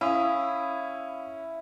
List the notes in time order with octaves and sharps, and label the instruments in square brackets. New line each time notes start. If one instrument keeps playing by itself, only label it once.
[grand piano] C#4 [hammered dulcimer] E4 [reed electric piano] F5 D#6